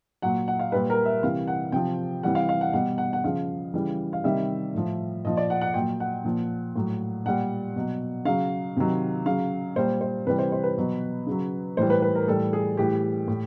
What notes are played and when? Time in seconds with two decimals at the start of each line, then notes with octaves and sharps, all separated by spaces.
0.22 A#2 F#3 F#5
0.48 F#5
0.59 F5
0.72 A#2 G3 B4
0.90 A#4
1.06 E5
1.23 C3 E3 G3 F5
1.47 F#5
1.72 C3 F3 G5
2.23 C3 E3 G3 F#5
2.35 F5
2.49 F5
2.61 F#5
2.73 B2 G3 F#5
2.98 F#5
3.13 F#5
3.24 C#3 F3 F5
3.74 C#3 E3 G3
4.13 F5
4.24 C3 D#3 G3 E5
4.74 A2 F3
5.25 A#2 F3 D#5
5.37 D5
5.50 F#5
5.61 F#5
5.74 A#2 F#3 G5
6.00 F#5
6.24 A#2 F3
6.76 A2 F#3
7.25 A#2 G3 F#5
7.76 B2 F#3
8.25 C#3 F#3 F5
8.76 C3 D#3 F#3
9.25 C#3 F#3 F5
9.76 A#2 G3 C5
10.01 C5
10.27 C3 E3 G3 B4
10.38 C5
10.52 C5
10.64 B4
10.77 B2 F#3
11.26 C#3 F#3
11.77 A2 E3 G3 C5
11.90 B4
12.02 B4
12.15 A#4
12.27 A2 E3 G3 A4
12.53 G#4
12.77 A2 E3 G3 G4
13.28 A2